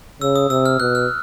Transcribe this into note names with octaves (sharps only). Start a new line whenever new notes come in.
C#3 E6
D#6
C3 E6
F6
B2 F#6
F6